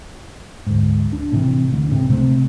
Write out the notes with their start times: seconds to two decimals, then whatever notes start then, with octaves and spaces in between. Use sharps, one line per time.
0.66 D2 G#2
1.13 D4
1.32 A2 C3 E3
1.73 D2
1.91 C#2 A2 C3
2.10 C3 A3 C4